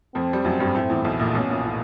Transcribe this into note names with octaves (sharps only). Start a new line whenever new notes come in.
F2 F3 C4
G3
F#2 F#3
G2 G3
A2 A3
E2 E3
B1 B2
A#1 A#2
B1 B2 C#4
A#1 A#2
A2